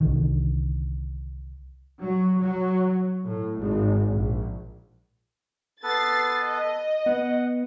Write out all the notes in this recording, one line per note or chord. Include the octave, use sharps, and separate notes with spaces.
C2 D3 D#3
F#3
F#3
A2
G#1
A#1
B3 A4 B4 A6 C7
D#5
B3 F#5